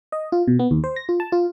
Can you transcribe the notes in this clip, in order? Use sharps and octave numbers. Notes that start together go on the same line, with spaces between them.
D#5
F4
B2
B3
D#2
C5
A#6
F4
A5
F4